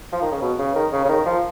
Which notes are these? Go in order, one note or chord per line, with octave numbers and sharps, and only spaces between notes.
F3
D#3
C#3
B2
C#3
D#3
C#3
C#3
D#3
F3